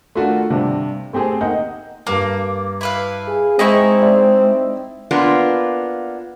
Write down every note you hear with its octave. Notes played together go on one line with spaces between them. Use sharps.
A3 D4 F4 F#4 A#4
G2 C3 D4
A3 C4 G4 G#4 C5
A#3 D#4 D#5 F#5 G6
G2 A#3 D6
E4 B4 F5
G#4
G#3 C4 D#4 E4 G#4 C5 D#5 C#6
D5 E5
A#3 B3 D4 F4